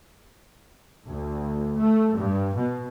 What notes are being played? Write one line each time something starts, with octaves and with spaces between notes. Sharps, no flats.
D2
A3
G2
B2